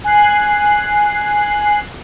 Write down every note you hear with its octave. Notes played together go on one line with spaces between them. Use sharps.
G#5 F#6 C7